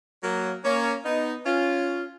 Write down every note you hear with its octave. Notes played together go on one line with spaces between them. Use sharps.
F#3 A#3
A#3 C#4
B3 D#4
C#4 F4